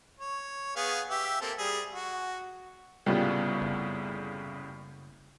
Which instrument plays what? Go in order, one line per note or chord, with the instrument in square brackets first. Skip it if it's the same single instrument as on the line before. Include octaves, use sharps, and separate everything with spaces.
[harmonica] C#5
B3 G#4 F5
G4 E5
A#3 C4 A4
G3 G#4
F#4
[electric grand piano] C2 A2 C#3 [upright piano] G3 [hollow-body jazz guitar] B3 F4 A4
[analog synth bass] F#1